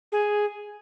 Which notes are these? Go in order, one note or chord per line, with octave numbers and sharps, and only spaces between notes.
G#4